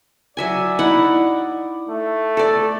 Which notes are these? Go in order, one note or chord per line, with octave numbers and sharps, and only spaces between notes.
F#3 D5 E5 G#5
D#4 E4 F#5
A3
A4 D5